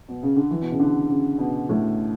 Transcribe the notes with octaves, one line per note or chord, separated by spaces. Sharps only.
B2
C#3
D3
E3
B2
C#3
D3
C#3
B2
A2